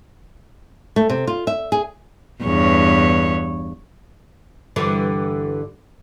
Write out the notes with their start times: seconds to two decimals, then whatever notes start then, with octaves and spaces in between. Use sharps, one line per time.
0.96 A3
1.10 C3
1.27 F4
1.47 E5
1.72 G#4
2.43 E2 G2 C#5
4.76 G2 D3 E3